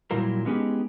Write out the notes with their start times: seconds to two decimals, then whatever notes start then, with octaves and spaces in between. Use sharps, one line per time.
0.11 A#2 F#3 G3 E4 F4 A#4
0.45 G#3 B3 C#4 D#4 G4 G#4